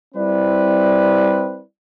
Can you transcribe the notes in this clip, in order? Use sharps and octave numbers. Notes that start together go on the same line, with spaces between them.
G3 C4 E4 B4 D5